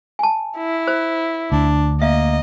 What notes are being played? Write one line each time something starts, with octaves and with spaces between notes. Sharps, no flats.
G#5 A5
E4
C5
D2 D4
A#3 D#5 E5